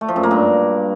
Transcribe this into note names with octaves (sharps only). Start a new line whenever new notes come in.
A3
F3
F#2
A#3
G2